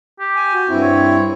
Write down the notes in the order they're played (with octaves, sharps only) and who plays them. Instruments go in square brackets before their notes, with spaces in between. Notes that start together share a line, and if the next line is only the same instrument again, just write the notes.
[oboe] G4
[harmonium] G#5
F#4
G2 C4 E4
[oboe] C#5